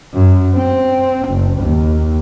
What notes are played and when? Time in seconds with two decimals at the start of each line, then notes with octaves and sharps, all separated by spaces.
0.14 F#2
0.56 C4
1.29 F#1
1.62 D#2